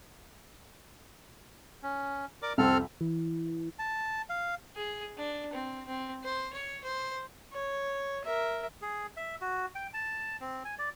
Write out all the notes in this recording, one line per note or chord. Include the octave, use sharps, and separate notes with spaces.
C#4
A#4 D5 D6
C2 F2 C4 A4 F6
E3
A5
F5
G#4
D4
C4
C4
C5
C#5
C5
C#5
A#4 E5
G#4
E5
F#4
G5
A5
C4
G#5
D5